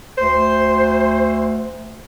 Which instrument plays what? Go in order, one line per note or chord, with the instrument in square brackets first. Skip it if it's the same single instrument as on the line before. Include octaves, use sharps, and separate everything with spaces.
[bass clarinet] D2 [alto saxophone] C5